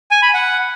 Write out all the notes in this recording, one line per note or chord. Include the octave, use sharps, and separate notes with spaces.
G#5
B5
F#5